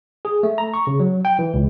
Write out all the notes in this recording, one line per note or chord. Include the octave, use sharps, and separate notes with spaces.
G#4
A3
A#5
C#6
C#3
F#3
G5
E3
C#2